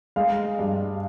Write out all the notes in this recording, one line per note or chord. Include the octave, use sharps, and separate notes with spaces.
G#3 F5
G2